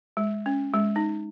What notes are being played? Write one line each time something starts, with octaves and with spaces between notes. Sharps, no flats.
G#3
C#4
G#3
D#4